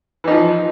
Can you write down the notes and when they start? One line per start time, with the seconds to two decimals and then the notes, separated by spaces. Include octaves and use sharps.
0.24 E3
0.27 D#4
0.31 F3